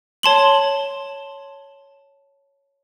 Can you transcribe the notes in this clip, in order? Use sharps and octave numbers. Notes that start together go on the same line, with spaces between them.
C#5 A5 C6 F#7